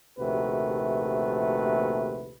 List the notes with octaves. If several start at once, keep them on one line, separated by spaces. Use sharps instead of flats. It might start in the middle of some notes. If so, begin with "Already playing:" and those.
A#1 D#2 C3 A3 F#4 B4